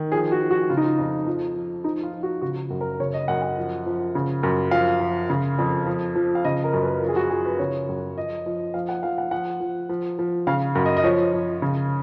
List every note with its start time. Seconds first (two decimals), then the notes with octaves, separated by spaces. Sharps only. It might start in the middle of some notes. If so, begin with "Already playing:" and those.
Already playing: D#3
0.12 F3 G#4
0.32 F#4
0.41 F3
0.51 F#4
0.70 C#3 F4
0.77 D#4
0.84 F4
0.98 F2
1.27 F3
1.55 F3
1.84 F3 D#4
2.03 F4
2.13 F3
2.23 F#4
2.42 C#3 F#4
2.70 F#2
2.81 A#4
3.00 C#3 C#5
3.14 D#5
3.28 F#2 F#5
3.42 F#5
3.57 F3
3.86 F3
4.15 C#3
4.43 F#2
4.71 F3 F5
5.00 F3
5.30 C#3
5.59 F2
5.86 F3
6.15 F3
6.35 F5
6.44 C#3 D#5
6.64 A#4
6.73 F#2
6.83 B4
7.02 F3
7.09 G#4
7.16 F#4
7.30 F3 G#4
7.45 B4
7.59 C#3 C#5
7.88 F#2
8.18 F3 D#5
8.46 F3
8.74 F3 F5
8.89 F#5
9.03 F3 F5
9.18 F#5
9.31 F3 F#5
9.60 F3
9.89 F3
10.19 F3
10.47 C#3 F5
10.75 F#2
10.86 D#5
10.97 D#5
11.04 F3 C#5
11.33 F3
11.62 C#3